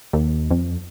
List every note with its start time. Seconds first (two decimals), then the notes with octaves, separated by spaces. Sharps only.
0.13 D#2
0.51 F2